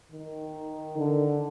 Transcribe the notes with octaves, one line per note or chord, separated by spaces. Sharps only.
D#3
D3